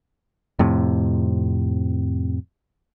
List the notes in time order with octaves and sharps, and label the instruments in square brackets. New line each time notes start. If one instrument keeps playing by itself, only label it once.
[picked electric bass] F2 A2 C3